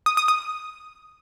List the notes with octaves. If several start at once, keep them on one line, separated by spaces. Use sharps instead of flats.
D#6
D#6
D#6